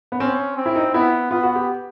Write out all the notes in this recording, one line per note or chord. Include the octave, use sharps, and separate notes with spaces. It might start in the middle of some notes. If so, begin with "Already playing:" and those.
B3
C4 C#4
C4
E4
D#4
B3 E4
B3 F4
F#4
G4